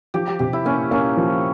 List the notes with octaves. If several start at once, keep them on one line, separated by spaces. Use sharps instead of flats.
F3 G4
G4
C3 G4
E4
A#3 C#4
A#3 C#4
F3